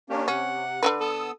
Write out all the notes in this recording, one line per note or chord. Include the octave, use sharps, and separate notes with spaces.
A#3 C#4 D4 G4
C3 C#4 F#5
D3 D#3 B4
B3 A4 D#6 E6